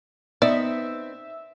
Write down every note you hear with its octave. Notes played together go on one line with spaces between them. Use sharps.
B3 C4 D#4 D5 E5